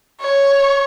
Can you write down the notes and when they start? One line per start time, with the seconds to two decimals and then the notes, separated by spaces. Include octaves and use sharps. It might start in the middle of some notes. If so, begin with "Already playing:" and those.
0.21 C#5